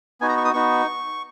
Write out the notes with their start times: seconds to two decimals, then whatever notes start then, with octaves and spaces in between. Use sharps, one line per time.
0.21 B3 D#4 F#4 G#5
0.29 A#5
0.37 C#6
0.45 D#6
0.53 B3 D#4 F#4 C#6